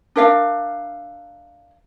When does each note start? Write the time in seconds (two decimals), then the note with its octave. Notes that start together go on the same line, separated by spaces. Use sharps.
0.16 D4 A#4 E5 F5